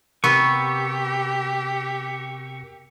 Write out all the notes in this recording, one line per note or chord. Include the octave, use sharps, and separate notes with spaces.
C3 B3 G4 A#4 C#6 E6